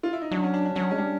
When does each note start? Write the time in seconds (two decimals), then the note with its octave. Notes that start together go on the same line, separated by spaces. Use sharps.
0.03 F4
0.13 E4
0.22 D#4
0.31 F#3 D4
0.43 C#4
0.54 D4
0.65 D4
0.76 F#3 C#4
0.91 G#3 C#4
0.98 G3 D4